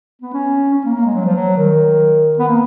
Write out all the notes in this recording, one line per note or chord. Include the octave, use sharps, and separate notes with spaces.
B3
C#4
C#4
A#3
A#3
G#3
F#3
F3
F#3
D#3
B3
A#3